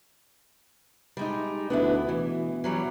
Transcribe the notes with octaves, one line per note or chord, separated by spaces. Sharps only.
G3 G#3 D#4
D2 B3 D4 E4
B2 E3
E3 F#3 G3